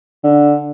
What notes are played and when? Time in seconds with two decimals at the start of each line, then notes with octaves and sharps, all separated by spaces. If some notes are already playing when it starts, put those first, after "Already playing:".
0.24 D3